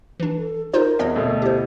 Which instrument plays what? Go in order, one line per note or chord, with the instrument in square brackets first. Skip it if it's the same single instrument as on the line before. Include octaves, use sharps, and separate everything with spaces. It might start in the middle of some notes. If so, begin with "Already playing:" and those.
[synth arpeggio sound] E3 D4
[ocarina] A4
[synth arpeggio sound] D#4 F4 C5 [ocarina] A#4
[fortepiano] E2 [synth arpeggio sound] C#5 D#5
[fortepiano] D2 B2 A3
[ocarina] E4 [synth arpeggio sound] G4 C5